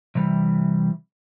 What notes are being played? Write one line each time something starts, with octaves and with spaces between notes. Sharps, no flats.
C3 E3 G3